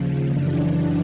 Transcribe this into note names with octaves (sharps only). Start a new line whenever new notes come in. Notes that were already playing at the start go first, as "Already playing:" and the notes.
Already playing: D#2 C#3 F3
F#2 C#3 E3 D4